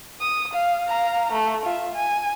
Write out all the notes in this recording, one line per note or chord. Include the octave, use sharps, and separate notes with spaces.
D#6
F5
F5 A#5
A3
F4 E5
G#5